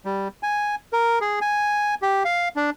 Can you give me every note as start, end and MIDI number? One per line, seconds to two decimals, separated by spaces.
0.05 0.28 55
0.43 0.75 80
0.93 1.19 70
1.21 1.39 68
1.41 1.95 80
2.02 2.23 67
2.25 2.49 77
2.56 2.70 62